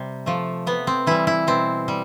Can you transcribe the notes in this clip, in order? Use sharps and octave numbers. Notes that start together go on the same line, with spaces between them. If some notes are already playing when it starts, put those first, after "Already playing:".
Already playing: C3 G3
F3 A3
C3 B3
C4
E3 G3 E4
E4
B2 C4
G3